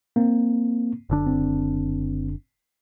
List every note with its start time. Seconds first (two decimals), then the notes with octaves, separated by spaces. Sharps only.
0.16 A#3 C4
1.10 F#1 D3 D4
1.27 C4